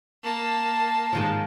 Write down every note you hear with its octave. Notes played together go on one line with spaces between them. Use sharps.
A#3 A5
G#2 D#3 F3